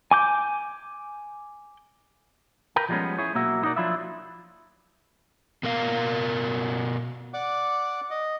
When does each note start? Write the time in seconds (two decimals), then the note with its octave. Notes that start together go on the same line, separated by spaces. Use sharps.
0.11 G#5 D6 G6
2.76 A#4 B4 G5
2.89 F3 G3 G#3 A#3 B3 C#4
3.18 E4 G#4 C#5
3.35 B1 A#3 F#4 E5
3.62 B3 D#4 F#4 A#4 D5
3.76 F3 F#3 D4 E4 F4 E5
5.63 B2 A#4 F5
7.34 D5 F#5 D6
8.11 D#5